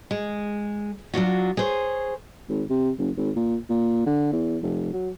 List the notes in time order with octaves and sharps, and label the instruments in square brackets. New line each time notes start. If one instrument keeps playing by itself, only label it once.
[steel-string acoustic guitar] G#3
F#3 D4 F4 F#4
G#4 C5 C#5
[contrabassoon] G#1
C3
F#1
G#1
A#2
A#2
D3
E2
F1
F#3